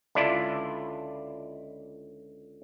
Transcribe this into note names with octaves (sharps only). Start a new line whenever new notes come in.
C#2 D3 D4 E4 F4 D5